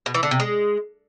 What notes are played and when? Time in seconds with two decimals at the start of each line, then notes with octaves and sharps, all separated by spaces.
0.06 B2
0.14 E3
0.23 D3
0.31 C3
0.40 G#3